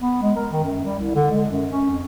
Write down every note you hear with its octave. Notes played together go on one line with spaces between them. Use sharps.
B3
G#3
A#4
D#3
F#2
G3
C2
D3
G#3
F#2
C#4
F2